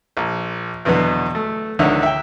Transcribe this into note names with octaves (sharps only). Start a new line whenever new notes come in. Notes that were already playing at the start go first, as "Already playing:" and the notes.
A#1
E2 B2 D3 F#3 B3
A3
C#2 D3 D#3 C#5 E5 F#5
E5 G5